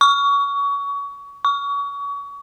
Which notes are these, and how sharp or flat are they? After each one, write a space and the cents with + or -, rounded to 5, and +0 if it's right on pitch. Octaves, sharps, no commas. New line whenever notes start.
C#6 +30
C#6 +35